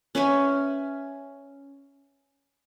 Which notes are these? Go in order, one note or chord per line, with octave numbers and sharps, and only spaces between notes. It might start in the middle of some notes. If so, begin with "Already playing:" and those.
C#4 B4 E5 G#5